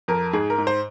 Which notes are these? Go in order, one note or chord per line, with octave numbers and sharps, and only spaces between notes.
F2 A#4
G#2 G#4
A#4
G#2
C5